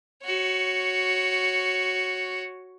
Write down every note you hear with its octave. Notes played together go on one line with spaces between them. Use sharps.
F#4 C#5